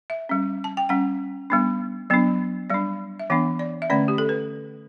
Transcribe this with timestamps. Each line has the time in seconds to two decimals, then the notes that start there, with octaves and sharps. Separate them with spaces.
0.10 E5
0.29 G3 C#4
0.64 A5
0.77 G5
0.89 G3 C#4 F#5
1.50 G3 B3 D4
2.10 F#3 B3 D4
2.70 G3 D4 D5
3.20 E5
3.30 E3 B3 D4 F#5
3.59 D5
3.82 E5
3.90 D3 A3 C#4 D5
4.08 G4
4.18 A4
4.29 B4